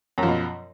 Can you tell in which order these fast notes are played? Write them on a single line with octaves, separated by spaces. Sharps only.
F#2 F3 B2